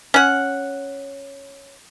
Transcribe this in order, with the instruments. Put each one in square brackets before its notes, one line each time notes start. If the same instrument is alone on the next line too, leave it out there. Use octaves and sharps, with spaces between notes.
[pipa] C#4 F#5